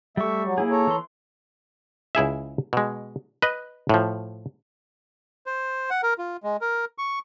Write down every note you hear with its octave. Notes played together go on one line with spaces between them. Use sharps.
G3 A3 E5 C#6
F#3
A#3 E4 G#4
A4 C#5 A#5
E3 C6
C#2 E4 G#4 E5
B2 G#3
B4 D#5
A2 F3
C5
F#5
A#4
F4
G#3
A#4
C#6